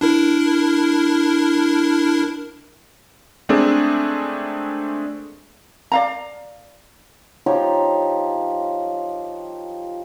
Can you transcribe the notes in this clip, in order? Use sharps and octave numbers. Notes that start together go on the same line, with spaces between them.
D4 E4 A#4
G#3 A3 C4 D4 G#4 A#4
D5 F5 A#5
F3 D#4 G4 C#5